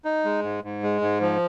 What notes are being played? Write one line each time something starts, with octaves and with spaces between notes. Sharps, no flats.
D#4
G#3
G#2
G#2
G#3
G#2
F3